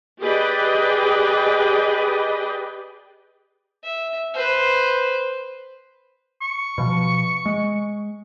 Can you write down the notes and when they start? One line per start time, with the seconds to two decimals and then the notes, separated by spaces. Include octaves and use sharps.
0.21 G4 G#4 B4 D5 D#5 G5
3.84 E5
4.34 B4 C5
6.41 C#6
6.78 B2 F3
7.46 G#3